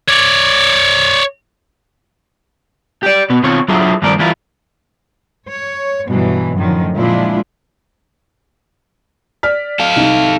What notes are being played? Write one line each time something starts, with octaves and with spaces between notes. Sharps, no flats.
C#5 D5
G4 D5
B2 B3
B2 D#3 C4 F4 C#5
F#3 D4 E4 F4 G#4 E5
G2 D#3 F3 A#3 D5
E3 G3 A#3 E4 F4
C#5
G2 B2 E3 F#3
F#2 A2 D3 D#3 F3
A#2 F3 G#3 D4 E4 F4
D5 F6 B6
A4 F5
C2 D#4